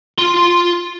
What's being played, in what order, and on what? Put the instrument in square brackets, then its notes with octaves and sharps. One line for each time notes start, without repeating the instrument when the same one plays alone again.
[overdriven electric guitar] F4 C6